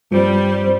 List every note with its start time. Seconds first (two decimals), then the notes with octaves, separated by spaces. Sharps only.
0.11 G2 F3 G3 C4
0.64 C4